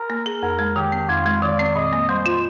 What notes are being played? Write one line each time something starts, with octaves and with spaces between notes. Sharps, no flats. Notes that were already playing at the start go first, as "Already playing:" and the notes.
Already playing: A#4
A#3
G#4
F2 A#4
G#3
D#3 G4
C4
F2 F4
G#3
D#3 D5
C4
A#2 D#5
A#3
G3 C5
F4